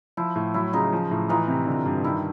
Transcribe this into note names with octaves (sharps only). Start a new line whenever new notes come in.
F3 E4
A2
F#3 E4
C#3 D#4 F4
F3
A2
E3 D#4 F4
C3
D3
G2
D#3 E4